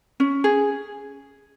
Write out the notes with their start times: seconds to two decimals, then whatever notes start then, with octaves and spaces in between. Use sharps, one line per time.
0.20 C#4
0.44 G#4